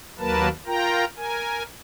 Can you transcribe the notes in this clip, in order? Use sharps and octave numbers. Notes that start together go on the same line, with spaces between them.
D#2 F#3 A#3 A#4 B4 A5
F4 A#4 G5 A#5
A#4 G#5